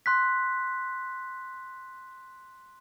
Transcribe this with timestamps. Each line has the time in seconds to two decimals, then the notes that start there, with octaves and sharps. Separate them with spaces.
0.06 C6 F#6 B6